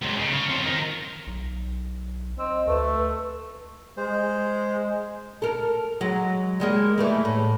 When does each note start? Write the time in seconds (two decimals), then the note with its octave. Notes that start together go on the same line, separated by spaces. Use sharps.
0.02 C#2 A#2
0.18 C#3
0.32 C#5 F5
0.50 C4 F4
0.65 D#3 A#4
1.27 B1
2.39 C4 D#5
2.67 D2 A3 B4
3.97 G#3 C5
5.42 A4 A#4
6.01 F#3 G#3
6.60 G3 G#3 A#3
6.98 E3 G3 A3
7.25 A2